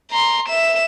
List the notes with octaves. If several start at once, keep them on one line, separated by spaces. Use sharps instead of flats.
A#5 C6
E5 E7